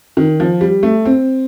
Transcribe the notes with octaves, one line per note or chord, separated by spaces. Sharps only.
D#3
F3
G3
A3
C4